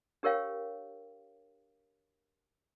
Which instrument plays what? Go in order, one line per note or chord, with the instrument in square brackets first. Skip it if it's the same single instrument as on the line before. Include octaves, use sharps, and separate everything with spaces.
[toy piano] D4 G4 A#4 C#5 F5 G5